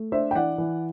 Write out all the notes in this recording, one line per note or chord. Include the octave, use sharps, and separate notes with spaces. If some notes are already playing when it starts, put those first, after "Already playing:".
Already playing: A3
D4 C5 E5
G5
E3 D5 F#5
E3